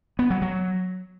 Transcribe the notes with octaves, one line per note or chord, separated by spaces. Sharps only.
B3
F#3
F#3